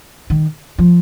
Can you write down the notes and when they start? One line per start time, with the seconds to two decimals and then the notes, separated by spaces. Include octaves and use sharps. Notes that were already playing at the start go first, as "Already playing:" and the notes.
0.30 D#3
0.78 F3